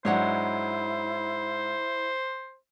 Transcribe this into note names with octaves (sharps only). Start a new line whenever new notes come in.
G#2 F#3 D4 E4 C5 C#5 F#5